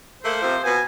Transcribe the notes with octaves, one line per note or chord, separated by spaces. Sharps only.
A3 A#3 C5
C3 F3
B2 B3 G#5